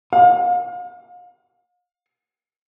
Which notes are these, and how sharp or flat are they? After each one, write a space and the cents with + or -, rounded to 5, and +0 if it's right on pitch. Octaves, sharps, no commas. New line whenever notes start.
F5 +40